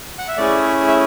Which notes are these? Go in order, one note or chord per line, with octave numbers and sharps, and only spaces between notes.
F#5
E5
A3 C#4 E4 G#4 D5
E5